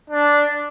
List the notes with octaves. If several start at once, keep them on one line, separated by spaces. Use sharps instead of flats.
D4